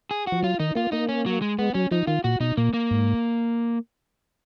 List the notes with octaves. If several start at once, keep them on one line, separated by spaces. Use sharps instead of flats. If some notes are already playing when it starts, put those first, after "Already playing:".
G#4
F3 F#4
F#3 F4
D#3 D#4
A#3 F4
A#3 D#4
C#4
F#3
G#3
G#3 B3
F#3 C#4
F3 D#4
D#3 F4
A#2 F#4
B2 D#4
A#2 A#3
A#3
G#2